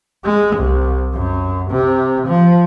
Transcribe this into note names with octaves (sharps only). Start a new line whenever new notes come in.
G#3
C2
F#2
C3
F3